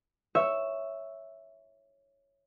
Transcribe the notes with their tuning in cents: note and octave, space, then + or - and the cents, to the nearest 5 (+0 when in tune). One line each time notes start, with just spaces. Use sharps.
C#5 +0 E5 +0